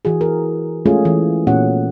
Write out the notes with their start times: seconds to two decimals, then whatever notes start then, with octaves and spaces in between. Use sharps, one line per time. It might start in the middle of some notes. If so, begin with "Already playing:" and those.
0.05 E3 F#4 G#4
0.21 G#4 A#4
0.86 G#3 A3 C#4 F4 G#4
1.05 E3
1.47 A#2 A3 B3 C#4 F#4 F#5